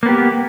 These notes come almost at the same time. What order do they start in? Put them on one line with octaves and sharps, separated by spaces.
A#3 B3 G4